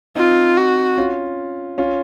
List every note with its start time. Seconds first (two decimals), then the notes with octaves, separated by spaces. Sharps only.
0.16 C4 D#4 F4
0.57 F#4
0.98 C#4 F4
1.78 C#4 F4